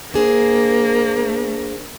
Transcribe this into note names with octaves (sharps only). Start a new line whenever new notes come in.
A#3 D4 G#4 C5